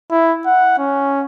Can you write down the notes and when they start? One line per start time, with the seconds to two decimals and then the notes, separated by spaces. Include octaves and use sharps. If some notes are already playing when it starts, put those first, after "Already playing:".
0.11 E4
0.46 F#5
0.78 C#4